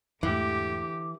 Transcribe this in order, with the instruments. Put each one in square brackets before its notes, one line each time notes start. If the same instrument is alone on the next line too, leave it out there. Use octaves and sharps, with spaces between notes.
[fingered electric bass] E2 G#2 A3 [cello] D3 G4 [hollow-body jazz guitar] E3 [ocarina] D6